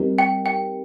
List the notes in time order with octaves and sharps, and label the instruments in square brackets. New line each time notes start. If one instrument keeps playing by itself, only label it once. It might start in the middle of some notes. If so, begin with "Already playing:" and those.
Already playing: [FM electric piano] G3 C4 D#4 G4 A#4
[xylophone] G5
G5